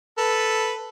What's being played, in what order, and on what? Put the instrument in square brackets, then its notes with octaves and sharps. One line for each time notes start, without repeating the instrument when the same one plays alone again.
[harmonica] A4 B4